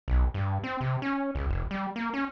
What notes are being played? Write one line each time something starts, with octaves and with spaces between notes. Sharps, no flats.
B1
G2
C4
C3
C#4
C#2
F1
G3
A#3
C#4